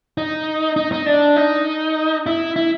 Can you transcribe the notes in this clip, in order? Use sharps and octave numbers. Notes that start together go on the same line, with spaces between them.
D#4
D#4
D#4
D4
D#4
E4
E4